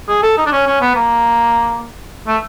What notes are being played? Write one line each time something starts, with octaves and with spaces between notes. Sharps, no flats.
G#4
A4
D#4
D4
C#4
C#4
B3
A#3
A3